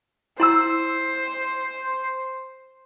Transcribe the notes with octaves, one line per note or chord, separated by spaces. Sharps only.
E4 C5 A#5 E6